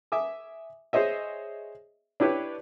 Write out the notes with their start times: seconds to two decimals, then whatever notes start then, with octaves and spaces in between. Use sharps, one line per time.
0.12 E5 G#5 D6 D#6
0.93 G#4 C5 C#5 D#5 E5
2.20 D4 E4 G4 B4 C#5 D5